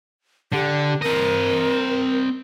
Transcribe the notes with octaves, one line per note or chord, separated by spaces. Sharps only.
D3 G4
C4 A#4 D#5